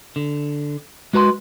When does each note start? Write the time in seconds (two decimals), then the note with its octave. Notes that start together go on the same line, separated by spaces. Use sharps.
0.16 D3
1.13 G#3 F#4 B4 A#5 C6